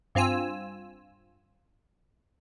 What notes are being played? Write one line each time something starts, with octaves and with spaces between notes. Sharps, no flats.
G2 C4 F4 G#5 E6